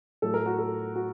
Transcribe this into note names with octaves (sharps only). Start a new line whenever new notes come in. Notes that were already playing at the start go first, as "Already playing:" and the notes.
A2 F#3 A4
A#4
F#4
A4
F#4